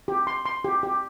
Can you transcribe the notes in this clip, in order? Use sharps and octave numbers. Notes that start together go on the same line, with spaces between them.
G4
C6
C6
G4
G4